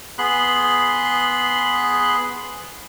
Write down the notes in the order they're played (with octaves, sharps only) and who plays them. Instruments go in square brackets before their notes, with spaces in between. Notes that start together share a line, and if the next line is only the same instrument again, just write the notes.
[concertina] B3 G#4 B5 C6 F#6